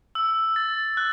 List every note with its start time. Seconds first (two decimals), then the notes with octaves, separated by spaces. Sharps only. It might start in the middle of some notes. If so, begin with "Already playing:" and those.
0.15 E6
0.56 A6
0.97 F#6